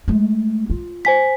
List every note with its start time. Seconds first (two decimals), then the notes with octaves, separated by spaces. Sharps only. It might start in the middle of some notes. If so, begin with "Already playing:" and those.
0.08 G#3 A3
0.70 F4
1.05 C5 G#5 B6